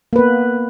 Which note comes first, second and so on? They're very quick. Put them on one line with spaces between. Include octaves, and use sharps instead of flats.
A#3 B4 B3